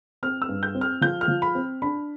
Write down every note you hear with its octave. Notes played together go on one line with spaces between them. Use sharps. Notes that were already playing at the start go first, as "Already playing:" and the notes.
C4 F6
E6
G2
G6
C4
F6
F3 G6
F6
F3
B5
C4
D4 B5